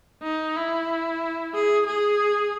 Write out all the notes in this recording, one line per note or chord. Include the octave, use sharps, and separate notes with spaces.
D#4
E4
G#4
G#4